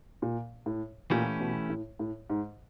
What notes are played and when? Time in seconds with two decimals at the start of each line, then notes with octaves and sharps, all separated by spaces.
0.22 A#2
0.66 A2
1.10 A#2 E3 A3 C#4 E4 G4
1.40 B2
1.70 A2
1.99 A2
2.30 G#2